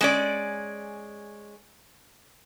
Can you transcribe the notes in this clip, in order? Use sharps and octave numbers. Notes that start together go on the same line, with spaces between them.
G#3 C#4 D5